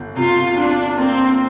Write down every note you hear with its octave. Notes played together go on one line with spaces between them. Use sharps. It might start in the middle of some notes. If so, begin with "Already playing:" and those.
Already playing: G1
C3 F4
D4 F4
A#3 C4